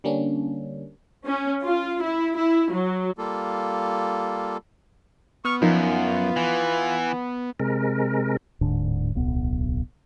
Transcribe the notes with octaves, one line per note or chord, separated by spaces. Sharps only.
D3 G3 A#3 C#4 D4
C#4
F4
E4
E4
F#3
G3 A#3 F4 A4
B3 C#6 D#6 F6
F#2 F3 D#4 F4 A#4
E3
C3 G#3 A#4
D1 G#2 D3 D4
D1 B1 B3